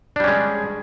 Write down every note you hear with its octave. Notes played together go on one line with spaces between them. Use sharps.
G3 G#3 C#4 D4